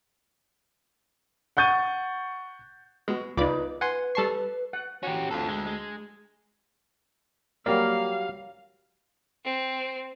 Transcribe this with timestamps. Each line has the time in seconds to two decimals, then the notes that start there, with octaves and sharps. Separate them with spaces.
1.57 F#5 C#6 G6 A6 D#7
3.08 G#3 B3 F#4
3.37 C#2 D#4 F4 B4 D5 B5 D6
3.81 B4 F#5 G#5 C6
4.15 G3 A4 A5 C#6 C7
4.73 F#5
5.03 C#4 F#4 G4
5.31 D2 F4 A4
5.48 G#3
5.67 G#3
7.66 F#3 G3 A#3 D5 F5
9.45 C4